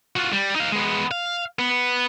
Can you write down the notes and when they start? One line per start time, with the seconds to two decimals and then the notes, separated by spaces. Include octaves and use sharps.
0.16 F4 F#4
0.33 G3
0.56 D#4 F5
0.72 G#3 B3
1.11 F5
1.59 B3